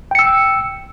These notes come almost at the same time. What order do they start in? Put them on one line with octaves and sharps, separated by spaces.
G5 C#7 E6